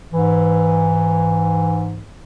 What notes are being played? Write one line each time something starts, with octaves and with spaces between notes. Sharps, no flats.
G#2 E3